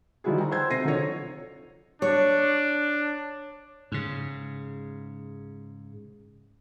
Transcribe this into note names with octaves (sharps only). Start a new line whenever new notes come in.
D#3 F3 G3 E4 F#4 G#4
G5 A#5
C5 F#5 C6 E6 G6 G#6
C3 A4 A#6 C7 D#7
D#3 F3 F#3 D4 A4 C#5
D4 C#5
G#2 C#3